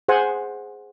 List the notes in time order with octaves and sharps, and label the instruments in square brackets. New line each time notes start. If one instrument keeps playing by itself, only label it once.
[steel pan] G#4 C5 F#5 G#5